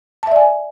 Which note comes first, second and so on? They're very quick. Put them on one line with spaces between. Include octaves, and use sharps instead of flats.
A5 E5 D5 G#5